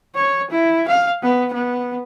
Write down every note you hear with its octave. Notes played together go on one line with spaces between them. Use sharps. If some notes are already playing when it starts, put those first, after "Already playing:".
C#5
E4
F5
B3
B3